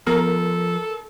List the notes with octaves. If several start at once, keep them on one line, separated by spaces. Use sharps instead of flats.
F3 B3 A4 A#4